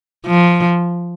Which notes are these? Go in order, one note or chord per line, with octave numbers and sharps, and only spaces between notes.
F3